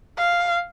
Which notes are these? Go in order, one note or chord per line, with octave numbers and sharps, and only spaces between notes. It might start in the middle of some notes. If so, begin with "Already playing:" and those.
F5